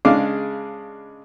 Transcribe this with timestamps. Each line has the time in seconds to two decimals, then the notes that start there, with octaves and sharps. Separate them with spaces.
0.05 C#3 G#3 D4 F5 D6